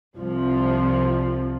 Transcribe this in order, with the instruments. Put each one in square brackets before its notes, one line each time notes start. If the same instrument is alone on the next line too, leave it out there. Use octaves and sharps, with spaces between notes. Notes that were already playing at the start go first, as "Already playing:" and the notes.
[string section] C2 C3 F3